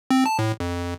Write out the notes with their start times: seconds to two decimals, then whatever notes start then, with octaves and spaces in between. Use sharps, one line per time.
0.11 C4
0.26 A5
0.39 A2
0.60 F2